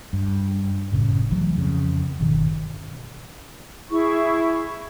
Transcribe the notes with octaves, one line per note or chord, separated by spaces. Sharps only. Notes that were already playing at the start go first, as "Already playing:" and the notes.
G2
F#1 A2 C#3
C2 E3 F#3 A3
F2 C#3
G1 B2 D#3
E4 G#4 C#6